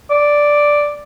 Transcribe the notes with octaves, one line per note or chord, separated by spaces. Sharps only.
D5